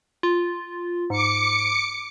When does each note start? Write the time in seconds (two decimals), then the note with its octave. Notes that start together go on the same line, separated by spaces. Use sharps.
0.23 F4
1.10 G#2 D6 C#7